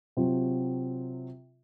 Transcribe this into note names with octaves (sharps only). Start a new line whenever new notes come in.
C3 F#3 C4 F4